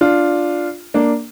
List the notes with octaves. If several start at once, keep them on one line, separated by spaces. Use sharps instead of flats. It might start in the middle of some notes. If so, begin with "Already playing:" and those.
D4 F4
A#3 D4